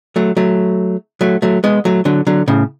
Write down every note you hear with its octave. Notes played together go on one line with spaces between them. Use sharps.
F#3 A3
F#3 A3
F#3 A3
F#3 A3
G#3 B3
F#3 A3
D3 F#3
D3 F#3
A2 C#3